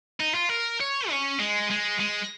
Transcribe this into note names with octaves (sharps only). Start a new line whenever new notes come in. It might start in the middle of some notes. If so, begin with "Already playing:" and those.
D#4
F4
A#4
C#5
C#4
G#3
G#3
G#3